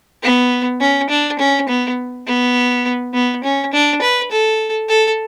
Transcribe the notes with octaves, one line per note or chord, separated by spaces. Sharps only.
B3
C#4
D4
C#4
B3
B3
B3
C#4
D4
B4
A4
A4